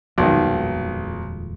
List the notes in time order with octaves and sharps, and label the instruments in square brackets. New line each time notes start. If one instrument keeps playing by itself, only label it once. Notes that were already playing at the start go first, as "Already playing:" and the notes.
[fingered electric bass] D#1 F2 G#3 [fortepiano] B1 D#3